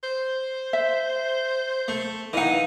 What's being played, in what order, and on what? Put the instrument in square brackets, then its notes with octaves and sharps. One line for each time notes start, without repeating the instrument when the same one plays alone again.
[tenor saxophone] C5
[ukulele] E5
[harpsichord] A3
[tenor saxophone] D#3 [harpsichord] E3 D#4 [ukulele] D#5 F5 F#5